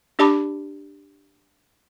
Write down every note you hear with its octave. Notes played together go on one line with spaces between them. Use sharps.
D4 G4 D5 A5 B5 D6